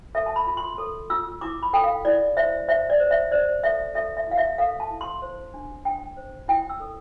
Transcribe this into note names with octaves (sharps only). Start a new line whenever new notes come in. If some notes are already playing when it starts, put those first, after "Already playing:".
A4 E5
A5
B5
F4
C6
A4
F4 E6
E4 D6
B5
A4 G5
F5
E4 D5
C5 E5
C5 E5
D5
C5
E5
C5 D5
A4 E5
A4 E5
E5
E4 F5
E5
A4 F5
A5
E4
C6
C5
D4
D4 G5
C5
E4 G5
E6
A4